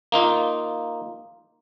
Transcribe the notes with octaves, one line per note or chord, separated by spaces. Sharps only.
A#3 D#4 F4